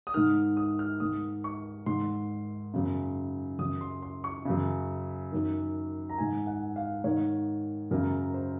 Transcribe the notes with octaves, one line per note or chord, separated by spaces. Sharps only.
D#6
G#2 D#3 F6
D#6
F6
G#2 D#3 D#6
C#6
G#2 D#3 C6
F#2 C#3
F#2 C#3 D#6
C6
C6
C#6
F#2 C#3
F#2 D#3
A#5
G#2 D#3 G#5
F#5
F5
G#2 D#3 C#5
F#2 C#3 A#4
C5